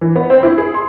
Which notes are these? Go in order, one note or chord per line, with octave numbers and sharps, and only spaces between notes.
E3
B3
C4
E4
G#4
C6